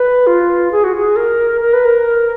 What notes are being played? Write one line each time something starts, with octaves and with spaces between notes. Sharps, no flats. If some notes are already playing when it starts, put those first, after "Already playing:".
Already playing: B4
F4
G#4
F#4
G#4
A#4
A#4
B4
A#4